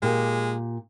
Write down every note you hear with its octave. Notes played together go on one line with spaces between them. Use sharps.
A#2 G#3 G4